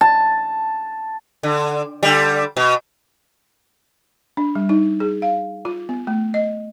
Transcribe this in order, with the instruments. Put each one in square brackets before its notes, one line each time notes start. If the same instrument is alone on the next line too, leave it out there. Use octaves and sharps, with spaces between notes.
[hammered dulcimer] A5
[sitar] D3
D3 G3
B2
[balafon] D4
G3
D#4
G#4
F5
F4
B3
A3
D#5